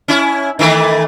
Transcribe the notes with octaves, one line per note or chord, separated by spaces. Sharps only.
C#4 E4
D#3 E3 A3